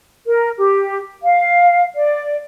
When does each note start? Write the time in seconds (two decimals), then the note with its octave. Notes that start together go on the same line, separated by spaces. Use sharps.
0.26 A#4
0.57 G4
1.23 F5
1.96 D5